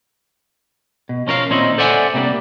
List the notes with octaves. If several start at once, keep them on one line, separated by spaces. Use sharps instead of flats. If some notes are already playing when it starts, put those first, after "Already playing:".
B2
F3 C#4 A#4 B4 F5
A#2 D#3 C4 C#4 D#4 E4
A4 C5 D5 E5 F#5 G#5
C3 G3 A#3 C4 D4